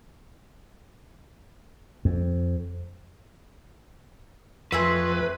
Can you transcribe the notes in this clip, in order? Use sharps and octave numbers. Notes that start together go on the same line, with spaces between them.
F2
F2 A3 C4 G#4 B4